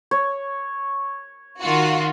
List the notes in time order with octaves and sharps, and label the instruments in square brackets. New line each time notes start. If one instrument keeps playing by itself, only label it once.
[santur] C#5
[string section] D#3 F4 F#4